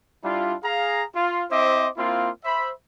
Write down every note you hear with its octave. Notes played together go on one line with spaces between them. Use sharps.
G3 D4 E4 F4
G#4 F5 A#5
F4
C4 E4 C5 D#5 E5 D6
A#3 C4 E4 F4
C5 E5 B5